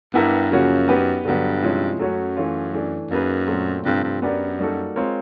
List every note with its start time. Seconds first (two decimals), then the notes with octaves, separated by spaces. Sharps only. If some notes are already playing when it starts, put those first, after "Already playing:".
0.14 G2 B3 E4 G4 A#4
0.51 F#2 C#3 F3 A#3 C#4 F#4
0.88 B3 D#4 G4 B4
1.25 G2 D3 F#3 B3
1.63 C3 F3 G#3 C#4 E4
2.00 F#2 F#3 A3 C#4 F#4
2.37 E3 A3 C#4 F4
2.74 E3 A3 D4
3.10 F#2 A#3 D#4 G#4 B4
3.47 A#2 F#3 A3 C4
3.85 G2 C3 F3 A3 C4
4.04 G2
4.21 F#2 B3 D4 G4 A#4 D5
4.59 G3 A#3 D#4 F#4 A4
4.96 G#3 C4 F4 A#4 C#5